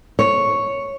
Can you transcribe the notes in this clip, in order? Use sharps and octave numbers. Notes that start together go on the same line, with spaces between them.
C#5